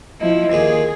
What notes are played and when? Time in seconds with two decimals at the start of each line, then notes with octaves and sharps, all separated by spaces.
0.21 F3 E4 D#5
0.52 D#2 A#2 G#4